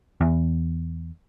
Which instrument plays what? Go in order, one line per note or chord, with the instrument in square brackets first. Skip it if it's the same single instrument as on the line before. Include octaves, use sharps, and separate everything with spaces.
[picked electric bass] E2